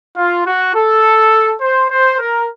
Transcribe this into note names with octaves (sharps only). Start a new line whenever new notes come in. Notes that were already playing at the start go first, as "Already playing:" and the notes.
F4
F#4
A4
C5
C5
A#4